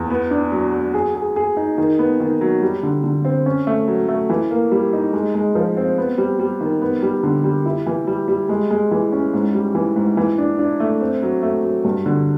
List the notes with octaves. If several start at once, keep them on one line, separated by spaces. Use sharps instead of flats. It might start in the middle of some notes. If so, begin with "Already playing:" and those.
Already playing: E2
B3
D4
F#3
F#3
G#4
G#4
G#4
D#4
D#3
B3
D#3
F#3
G3
D3
D3
C4
C#4
A3
F#3
A3
E3
A#3
G3
D#4
G#3
G#3
F3
C4
B3
G3
G3
D#3
B3
G3
D3
G3
E4
E3
G3
G3
G#3
G#3
E3
C#4
G#2
G3
E3
G#2
E3
D4
D4
A3
C4
F#3
A3
F#3
G2
D3